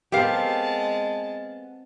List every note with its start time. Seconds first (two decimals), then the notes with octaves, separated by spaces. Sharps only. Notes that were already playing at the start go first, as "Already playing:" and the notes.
0.12 G#3 B3 C4 G4 A#4 F5 A5